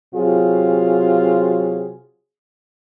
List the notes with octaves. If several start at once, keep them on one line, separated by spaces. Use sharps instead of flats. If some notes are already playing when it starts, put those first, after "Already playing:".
C3 F#3 F4 F#4 G#4